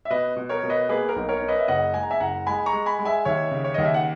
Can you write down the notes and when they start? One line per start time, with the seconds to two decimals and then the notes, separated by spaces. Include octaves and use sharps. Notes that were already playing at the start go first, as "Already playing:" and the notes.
0.05 E5
0.10 B2 B4 D#5
0.36 B2
0.49 A#4 C#5
0.63 B2
0.69 B4 D#5
0.89 A#3 G#4 B4
1.09 A#4
1.16 B1
1.29 A#4 C#5
1.42 C#4
1.48 B4 D#5
1.59 E5
1.68 F#1 D#5 F#5
1.94 G#3 G#5
2.03 A#5
2.10 E5 G#5
2.20 F#1 F#5 A#5
2.46 G#3 G#5 B5
2.66 A#5 C#6
2.73 G#3
2.86 G#5 B5
2.99 G#3
3.05 E5 G#5
3.25 D#2 C#5 E5
3.51 C#3
3.64 C#5
3.74 D#2 D#5
3.85 E5
3.94 F#5